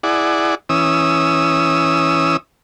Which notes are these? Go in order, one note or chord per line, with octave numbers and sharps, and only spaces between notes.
E4 G#4 D5 F#5
E3 C#4 D#6 E6